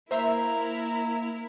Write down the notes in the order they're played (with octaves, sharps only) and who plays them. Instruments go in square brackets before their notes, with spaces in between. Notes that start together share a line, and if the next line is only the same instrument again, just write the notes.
[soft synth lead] A#3 [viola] E4 A#4 [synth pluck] C5 E5 C6 [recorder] A#5